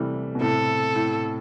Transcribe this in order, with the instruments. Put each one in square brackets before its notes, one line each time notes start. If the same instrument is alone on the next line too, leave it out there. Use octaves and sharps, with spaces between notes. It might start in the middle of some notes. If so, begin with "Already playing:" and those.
Already playing: [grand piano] C3 E3 G3 A3
B2
[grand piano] A2 C3 [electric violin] A4
[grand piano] A2